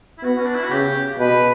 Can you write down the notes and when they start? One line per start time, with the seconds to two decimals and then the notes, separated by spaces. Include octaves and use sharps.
0.18 E4
0.23 B3 F#4
0.37 C#4
0.46 D4
0.54 E4
0.63 F#4
0.71 C#3 G4
1.18 B2 B4